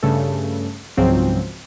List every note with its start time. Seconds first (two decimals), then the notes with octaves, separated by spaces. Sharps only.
0.03 G2 C#3 A3 A4
0.97 C#2 G#2 C#3 F3 F#3 C4